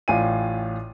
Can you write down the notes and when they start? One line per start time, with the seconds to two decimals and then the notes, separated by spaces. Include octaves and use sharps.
0.08 A1 A2 F4 D5 G#5 D#7